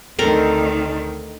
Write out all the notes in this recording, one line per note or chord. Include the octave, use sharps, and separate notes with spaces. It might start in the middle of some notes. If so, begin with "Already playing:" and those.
D2 D#3 C4 A4 A#4